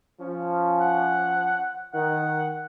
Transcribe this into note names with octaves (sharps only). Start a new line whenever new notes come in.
F3 C#4
F#5
D#3 F#5